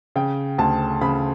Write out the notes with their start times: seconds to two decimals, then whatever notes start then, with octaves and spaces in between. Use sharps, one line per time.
0.16 C#3 G5
0.58 D2 A5
1.01 C#3 B5